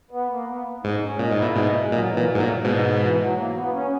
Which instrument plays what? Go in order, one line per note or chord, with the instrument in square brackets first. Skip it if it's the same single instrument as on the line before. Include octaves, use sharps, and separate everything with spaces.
[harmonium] B3
A#3
B3
[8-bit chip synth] G#2 [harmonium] D#4
[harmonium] C#4
[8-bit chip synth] A#2 [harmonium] D#4
[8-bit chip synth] G#2
[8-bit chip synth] A#2 [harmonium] E4
[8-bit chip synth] G#2 B2 [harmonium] D#4
[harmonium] G#3
[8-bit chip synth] A#2 [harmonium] F#3
[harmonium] E3
[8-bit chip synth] A#2
[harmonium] F#3
[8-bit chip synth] G#2
A#2
[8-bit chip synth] G#2 B2 [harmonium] D#4
[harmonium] E3
F#3
A#3
B3
C#4